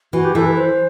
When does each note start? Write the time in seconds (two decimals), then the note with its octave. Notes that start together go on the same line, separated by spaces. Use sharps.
0.13 E3 F#4
0.25 G4
0.35 E3 A4
0.46 B4
0.57 C5